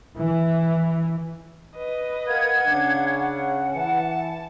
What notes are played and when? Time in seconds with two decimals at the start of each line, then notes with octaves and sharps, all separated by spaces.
0.17 E3
1.76 B4 D#5
2.28 A#4 F5 F#5 G#6
2.68 C#3 D4
3.17 F#5
3.75 E3 A5